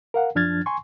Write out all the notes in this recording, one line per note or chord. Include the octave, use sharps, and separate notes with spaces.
A#4 F5 F#5
F#2 F3 D4 F6 G#6 A6
G#5 C6 C#6